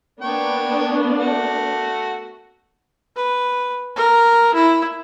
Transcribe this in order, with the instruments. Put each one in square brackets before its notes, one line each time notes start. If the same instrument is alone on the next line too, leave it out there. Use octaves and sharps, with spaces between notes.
[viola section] A#3 B3 D4 [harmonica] C#5 G5
[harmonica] A3 F#4
[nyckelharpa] B4
A#4
E4